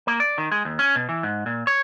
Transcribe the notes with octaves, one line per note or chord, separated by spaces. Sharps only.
A#3
D5
D#3
G#3
D#2
C#4
B2
E3
G#2
A#2
C#5